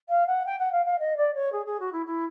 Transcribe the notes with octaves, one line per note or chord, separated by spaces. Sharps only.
F5
F#5
G5
F#5
F5
F5
D#5
D5
C#5
G#4
G#4
F#4
E4
E4